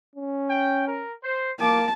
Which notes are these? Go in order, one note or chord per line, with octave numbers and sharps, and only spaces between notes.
C#4
G5
A#4
C5
A#3 A5 D6